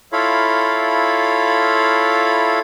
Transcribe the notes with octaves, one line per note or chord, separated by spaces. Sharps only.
E4 F4 A4 C#5 F5 B5